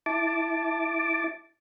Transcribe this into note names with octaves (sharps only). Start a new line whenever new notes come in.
E4 A5 D6